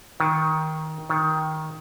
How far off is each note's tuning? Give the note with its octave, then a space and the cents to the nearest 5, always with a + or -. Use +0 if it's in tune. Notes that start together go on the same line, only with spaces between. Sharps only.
D#3 +15
D#3 +10